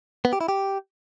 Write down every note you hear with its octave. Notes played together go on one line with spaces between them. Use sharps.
B3
G4
E4
G4